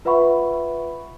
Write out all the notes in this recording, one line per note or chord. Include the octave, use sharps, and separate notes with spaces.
F4 B4 E5 F#5 B5 C#6